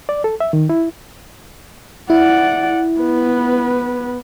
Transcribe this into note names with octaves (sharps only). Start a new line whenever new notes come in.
D5
A4
E5
D#3
E4
E4 D5 F#5
B3 B4